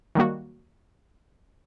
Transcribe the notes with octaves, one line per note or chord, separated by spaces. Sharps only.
D#3 F#3 G3 A#3 F#4